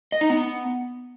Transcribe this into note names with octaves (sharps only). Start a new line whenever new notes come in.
D#5
D#4
B3